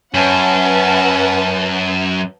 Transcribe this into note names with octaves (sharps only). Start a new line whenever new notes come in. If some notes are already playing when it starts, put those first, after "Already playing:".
F#2 C#4 B4 F#5 A5